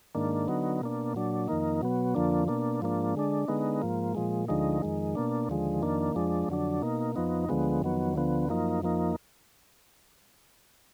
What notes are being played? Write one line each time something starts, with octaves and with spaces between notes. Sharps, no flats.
G#2 D#3 A#3 D4
D3 F#3 B3 D#4
B2 A#3 D4
A#2 F#3 D4
F2 D#3 A#3 D#4
B2 F#3 B3
F2 D3 F3 A#3 D4
B2 A#3 D4
G#2 F3 A#3 D4
D3 G#3 D4
D3 G#3 B3 D#4
G#2 F3 A#3
A#2 F3 G#3
D2 D3 F3 G#3 D#4
F2 D#3 G#3
B2 A#3 D4
D#2 D3 F3 G#3
F2 D#3 A#3 D4
F2 F3 G#3 D4
F2 D3 F#3 D4
B2 A#3 D#4
F2 F3 B3 D#4
D2 D3 F3 G#3 B3
F2 D#3 F#3 B3
D2 D3 F3 B3
F#2 F3 A#3 D#4
F2 F3 A#3 D#4